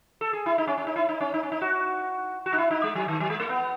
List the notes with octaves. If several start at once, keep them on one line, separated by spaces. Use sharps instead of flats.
A4
G#4
E4
D#4
C#4
C#4
D#4
E4
D#4
C#4
D#4
C#4
D#4
F#4
F#4
D#4
E4
D#4
G#3
F#3
D#3
F#3
G#3
A3
B3